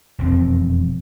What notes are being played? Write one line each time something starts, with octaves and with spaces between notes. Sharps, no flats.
E1 F2 C4